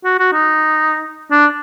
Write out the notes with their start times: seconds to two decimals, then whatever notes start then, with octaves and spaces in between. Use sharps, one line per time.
0.04 F#4
0.19 F#4
0.33 D#4
1.31 D4